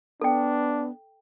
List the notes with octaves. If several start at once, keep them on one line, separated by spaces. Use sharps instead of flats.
B3 D4 A4 G5